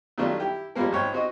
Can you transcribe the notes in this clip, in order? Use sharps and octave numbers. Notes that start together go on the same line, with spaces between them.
D#3 F#3 G3 A3 D4 F4
E4 G4
F3 G3 G#3 A#3 A#4
G#1 C#5 G5
C4 F#4 D#5